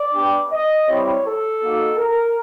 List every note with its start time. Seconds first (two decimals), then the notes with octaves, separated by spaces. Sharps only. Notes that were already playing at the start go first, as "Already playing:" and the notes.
Already playing: D5
0.12 B3 D4 G4
0.50 D#5
0.87 G3 C4 E4 G4 C#5
1.24 A4
1.61 A#3 D#4 F#4
1.98 A#4